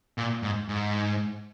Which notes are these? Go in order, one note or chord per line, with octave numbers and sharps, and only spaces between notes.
A#2
G#2
G#2